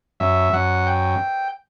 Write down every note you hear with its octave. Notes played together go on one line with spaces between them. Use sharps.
F#2 E5
F#2 F#5
G5